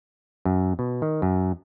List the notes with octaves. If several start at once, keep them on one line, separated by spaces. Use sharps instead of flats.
F#2
B2
D#3
F#2